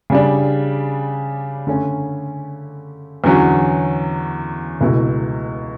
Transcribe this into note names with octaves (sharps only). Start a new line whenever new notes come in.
C#3 G3 D4
D3 A3 C#4
E2 D3 F#3 C#4 F#4
C#2 B2 A3 E4